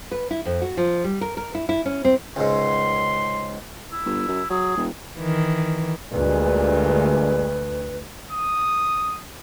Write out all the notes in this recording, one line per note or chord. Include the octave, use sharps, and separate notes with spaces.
B4
E4
F2
F#4
F3
G3
A#4
A#4
E4
E4
C#4
C4
C#2 G#2 C6
E4
G1
F#2
F#3 G#4
E1
D#3 E3
D2 G2 A#2 G#3 B4
D#6